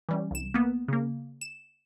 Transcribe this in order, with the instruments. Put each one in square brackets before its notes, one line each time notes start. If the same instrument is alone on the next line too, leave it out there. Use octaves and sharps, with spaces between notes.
[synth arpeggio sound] E3 G3 C#4
C2 E7
A#3 B3
C#3 A#3
E7